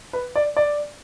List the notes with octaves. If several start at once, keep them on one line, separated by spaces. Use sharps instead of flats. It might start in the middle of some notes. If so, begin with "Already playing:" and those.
B4
D5
D5